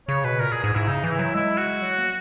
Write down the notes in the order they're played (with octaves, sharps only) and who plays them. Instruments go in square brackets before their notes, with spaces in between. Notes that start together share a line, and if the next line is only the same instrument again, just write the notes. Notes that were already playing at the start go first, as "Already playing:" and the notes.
[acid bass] C#3 [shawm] C#5
[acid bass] B2 [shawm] B4
[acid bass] A#2 [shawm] A#4
[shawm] G#4
[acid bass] G#2 [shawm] G#4
[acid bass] G#2 [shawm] E4
[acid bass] C#3 [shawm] D#4
[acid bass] E3 [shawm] D#4
[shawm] E4
[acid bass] F#3
[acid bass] G#3 [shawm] E4
[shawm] F#4
[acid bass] F#3
A#3